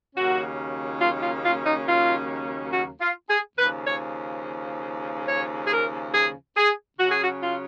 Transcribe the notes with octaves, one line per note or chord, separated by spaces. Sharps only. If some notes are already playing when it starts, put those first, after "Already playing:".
D#2 C#3 F#3 A#3 C#4 F#4
F4
F4
F4
D#4
F4
F#4
F4
G#4
D#2 C#3 F3 B4
C#5
C#5
G#4
A#4
G#4
G#4
C#3 F#3 C#4 F#4
G#4
F#4
F4